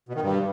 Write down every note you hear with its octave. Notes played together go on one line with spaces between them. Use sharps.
B2
D#3
G2